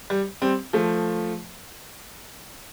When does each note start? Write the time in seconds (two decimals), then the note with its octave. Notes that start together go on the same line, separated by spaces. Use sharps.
0.10 G3
0.42 G3 C4
0.73 F3 A3